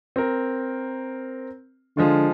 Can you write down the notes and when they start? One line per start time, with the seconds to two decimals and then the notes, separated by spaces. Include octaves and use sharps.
0.16 C4 A#4
1.97 D3 F3 G#3 F4